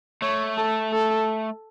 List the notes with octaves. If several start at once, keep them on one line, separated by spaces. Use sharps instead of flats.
A3 C#5
A4
A4